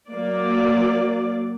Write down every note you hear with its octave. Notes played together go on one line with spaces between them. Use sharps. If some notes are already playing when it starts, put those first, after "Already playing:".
F#3 A#3 D5